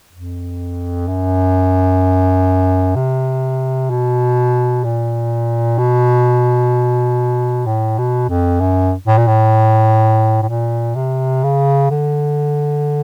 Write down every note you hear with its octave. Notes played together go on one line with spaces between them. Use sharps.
F2
F#2
C3
B2
A#2
B2
A2
B2
F2
F#2
A2
A#2
A2
A2
A#2
C3
C#3
D3